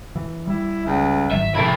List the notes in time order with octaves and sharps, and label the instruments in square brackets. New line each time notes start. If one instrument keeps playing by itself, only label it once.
[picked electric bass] E3
[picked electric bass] G3 [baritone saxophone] E4
[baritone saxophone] C#2
[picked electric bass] G#1 D#3 F#3 [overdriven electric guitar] E5
[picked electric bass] A2 C3 F3 [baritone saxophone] A3 [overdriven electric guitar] E4 A#4